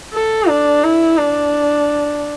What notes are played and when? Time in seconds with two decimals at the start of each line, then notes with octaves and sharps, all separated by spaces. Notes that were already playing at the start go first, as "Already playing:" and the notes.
0.14 A4
0.49 D4
0.84 E4
1.18 D4